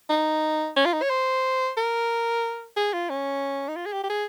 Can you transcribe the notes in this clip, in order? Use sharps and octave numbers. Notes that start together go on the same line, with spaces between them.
D#4
C#4
F4
D#4
C#5
C5
A#4
G#4
F4
C#4
D#4
F4
G#4
G4
G4
G#4